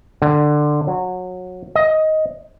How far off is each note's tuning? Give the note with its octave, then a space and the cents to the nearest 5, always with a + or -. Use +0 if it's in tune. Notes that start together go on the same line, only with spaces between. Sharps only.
D3 +15
F#3 -20
D#5 +10